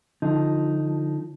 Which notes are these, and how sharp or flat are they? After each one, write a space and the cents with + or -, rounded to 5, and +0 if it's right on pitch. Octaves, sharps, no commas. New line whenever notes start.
D3 +0 F3 +0 D#4 +0